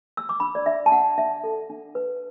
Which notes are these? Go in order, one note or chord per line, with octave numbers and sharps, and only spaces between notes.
E6
D6
D4 B5
D5
D4 E5
A5
D4 F#5
D4 E5
A4
D4
B4